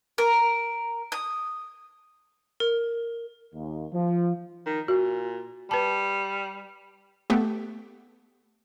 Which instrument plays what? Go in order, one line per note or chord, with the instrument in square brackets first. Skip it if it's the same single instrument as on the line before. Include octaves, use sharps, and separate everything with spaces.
[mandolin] A#4
D#6
[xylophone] A#4
[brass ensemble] D#2
F3
[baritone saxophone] D#3
[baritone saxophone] A#2 [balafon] F#4
[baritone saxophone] G3 [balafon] B4 A5
[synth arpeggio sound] A3 B3 G4 A4